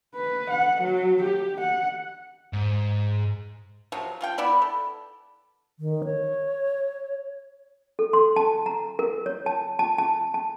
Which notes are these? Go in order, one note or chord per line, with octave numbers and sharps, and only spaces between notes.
B4
F#5
F#3
G4
F#5
G#2
C3 F3 F#3
F3 F4 G5
B3 E4 D5 B5
A4
D#3
C#5
A4
C6
A5
A#5
A#4
C#5
A5
A5
A5
A5